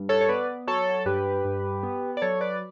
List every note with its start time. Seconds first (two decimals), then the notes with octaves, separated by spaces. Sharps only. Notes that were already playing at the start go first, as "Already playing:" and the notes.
Already playing: G2
0.09 A4 C#5
0.21 C#5
0.29 B3 B4 D5
0.67 F#3 A4 C#5
1.05 G2 G4 B4
1.45 G2
1.83 B3
2.17 D5
2.22 F#3 A4 C#5
2.41 B4 D5